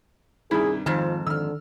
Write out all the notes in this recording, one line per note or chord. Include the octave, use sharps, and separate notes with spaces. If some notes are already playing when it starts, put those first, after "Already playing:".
G2 C3 D#3 E4 G#4
F2 G#2 D#3 F3 A5 F6
D3 D#3 E6 F6